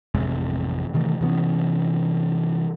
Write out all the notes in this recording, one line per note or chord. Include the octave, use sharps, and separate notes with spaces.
A1 F2 C3 G#3
C3 D#3 E3 A3
C3 E3 B3 C#4